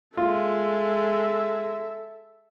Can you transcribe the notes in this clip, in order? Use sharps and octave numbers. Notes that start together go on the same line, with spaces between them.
G#3 F4 A4 E5